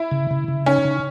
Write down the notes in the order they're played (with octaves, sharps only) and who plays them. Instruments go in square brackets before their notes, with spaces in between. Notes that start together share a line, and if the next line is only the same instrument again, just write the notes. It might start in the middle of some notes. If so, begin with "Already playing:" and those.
Already playing: [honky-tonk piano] E4
[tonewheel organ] C#3
C#3
C#3
[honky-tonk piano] C#4 [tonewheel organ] D#4
[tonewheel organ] C#3